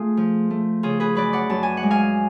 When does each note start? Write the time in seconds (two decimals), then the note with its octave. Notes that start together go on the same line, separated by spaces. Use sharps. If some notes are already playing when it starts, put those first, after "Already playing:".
Already playing: A3 F4 G#4
0.17 F3
0.51 A3
0.83 C#3 F4 G#4
1.00 G#4 B4
1.15 F#2 B4 D5
1.33 D5 F#5
1.49 F#2 A5
1.63 G#5
1.77 F#5
1.83 G#3
1.91 F5 G#5